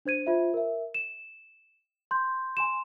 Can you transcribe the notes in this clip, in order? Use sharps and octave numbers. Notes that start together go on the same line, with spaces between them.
D4 C5 G#6 D#7
F4 C5 E5
A#4 E5
E7
C6 G6
G#5 C6 E7